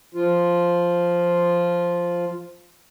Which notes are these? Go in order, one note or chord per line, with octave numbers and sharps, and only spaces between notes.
F3 F4